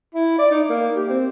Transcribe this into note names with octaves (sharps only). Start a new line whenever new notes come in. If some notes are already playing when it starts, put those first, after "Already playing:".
E4
D5
D#4
A#3
G4
C4